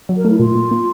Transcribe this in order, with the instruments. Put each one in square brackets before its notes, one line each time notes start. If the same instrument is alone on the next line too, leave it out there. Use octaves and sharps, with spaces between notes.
[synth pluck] F#3
[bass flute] A#4
[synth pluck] A3
[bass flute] E4
[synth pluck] A#2 [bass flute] F4
[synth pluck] A#2
A#2